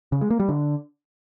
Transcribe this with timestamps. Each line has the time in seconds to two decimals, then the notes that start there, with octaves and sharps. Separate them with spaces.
0.12 C#3
0.21 G#3
0.30 A#3
0.40 G3
0.49 D3